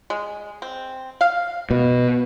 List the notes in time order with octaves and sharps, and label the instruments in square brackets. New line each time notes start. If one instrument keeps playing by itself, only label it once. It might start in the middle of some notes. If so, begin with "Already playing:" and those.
[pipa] G#3
C4
F5
[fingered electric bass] B2